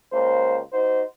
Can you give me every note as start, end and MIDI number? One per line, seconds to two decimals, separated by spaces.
0.13 0.59 37
0.13 0.59 58
0.13 0.59 72
0.72 1.03 63
0.72 1.03 66
0.72 1.03 72